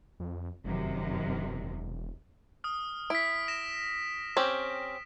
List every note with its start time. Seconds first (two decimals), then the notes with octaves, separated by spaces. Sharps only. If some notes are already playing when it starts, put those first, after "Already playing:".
0.20 F2
0.64 F1 F#2 C3 D#3
1.27 E1
2.64 D#6 F6
3.10 E4 B6 D7
3.48 A#6 E7
4.37 C4 C#4 G4